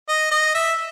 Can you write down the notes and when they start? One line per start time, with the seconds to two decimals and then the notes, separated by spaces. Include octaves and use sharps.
0.09 D#5
0.32 D#5
0.55 E5